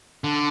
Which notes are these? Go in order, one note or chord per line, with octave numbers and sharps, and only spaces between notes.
D3